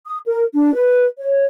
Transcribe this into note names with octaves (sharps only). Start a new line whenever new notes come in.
D#6
A#4
D4
B4
C#5